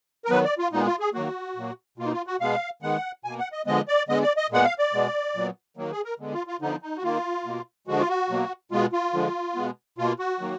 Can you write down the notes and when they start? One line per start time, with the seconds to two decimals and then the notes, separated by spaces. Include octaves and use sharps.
0.25 A#4
0.30 D#3 F#3 B3 B4
0.45 D5
0.58 F4
0.72 A#2 G#3 B3 D#4
0.86 F4
1.00 G#4
1.14 D#3 F#3 A#3 F#4
1.56 A#2 F#3 A#3
1.98 B2 A#3 F4
2.06 D#4
2.12 F4
2.27 F#4
2.40 B2 G#3 B3 F5
2.82 D#3 G#3 B3 F#5
3.25 B2 A#3 G#5
3.39 F#5
3.52 D#5
3.66 D3 F3 G#3 B3 D#5
3.88 D5
4.09 D3 G#3 B3 D#5
4.23 D5
4.37 D#5
4.51 A#2 G#3 B3 F#5
4.64 F5
4.79 D5
4.93 B2 G#3 B3
5.35 A#2 F#3 B3
5.77 D#3 F#3 A#3
5.91 G#4
6.05 A#4
6.20 D3 G#3 B3
6.33 F4
6.47 F4
6.61 D3 F3 B3 D#4
6.82 D#4
6.97 F#4
7.03 D#3 A#3 F4
7.45 B2 A#3
7.87 D3 F3 G#3 F#4
7.99 F4
8.08 F#4
8.30 B2 F#3 A#3
8.71 B2 G#3 B3 F4
8.92 F4
9.13 D3 F3 G#3
9.56 B2 G#3 B3
9.98 B2 A#3 F4
10.19 F#4
10.40 D#3 F#3 A#3